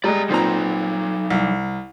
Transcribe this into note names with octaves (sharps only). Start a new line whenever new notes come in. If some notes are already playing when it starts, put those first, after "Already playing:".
G3 G#3 D5 A#5
A#2 F#3 C4 D#4 A#5
C2